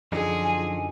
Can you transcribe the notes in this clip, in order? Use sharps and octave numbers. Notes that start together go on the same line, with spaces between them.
F#2 D3 F3 D#4 G#4
G#5